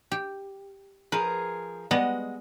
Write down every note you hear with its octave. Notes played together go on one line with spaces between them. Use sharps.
G4
F3 G#4 A#4 B4
G3 G#3 B3 D#5 F#5